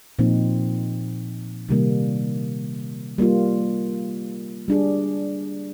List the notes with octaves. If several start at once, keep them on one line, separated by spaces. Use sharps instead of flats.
A#2 F3 C4 D#4
C3 D#3 G3 A#3
G3 A#3 F4
G3 D4 G#4